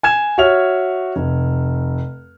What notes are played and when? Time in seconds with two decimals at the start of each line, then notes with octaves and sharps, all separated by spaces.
0.03 G#5 G#6 E7
0.38 F#4 C#5 E5 F6 F7
1.16 F1